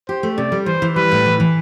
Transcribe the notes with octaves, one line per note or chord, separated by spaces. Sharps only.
G4 C5
A3
C3 D5
G3
E3 C5
E3
G3 B4
A2
E3
E3